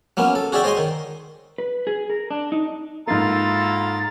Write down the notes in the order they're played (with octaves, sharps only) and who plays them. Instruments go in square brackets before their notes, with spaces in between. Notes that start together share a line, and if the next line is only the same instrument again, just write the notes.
[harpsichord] F#3 A#3 B3 C#4
A4
F#4 G#4 C#5 D5 E5 G5
C5 C#5 D#5 G#5 C6
D#3
[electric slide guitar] B4
G#4
A#4
D4
D#4
[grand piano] G#2 A#3 [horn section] E4 F4 A4 [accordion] A#5 [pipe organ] A6